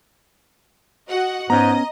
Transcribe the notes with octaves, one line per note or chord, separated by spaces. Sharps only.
F#4 D#5 F#5
G#2 B3 C#4 D#5 A#5